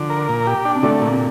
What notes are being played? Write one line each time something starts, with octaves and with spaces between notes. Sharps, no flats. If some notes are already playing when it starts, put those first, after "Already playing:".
Already playing: D3 F3
A#4
A#2
G4
D4
C3
D3 A3
A#2
C3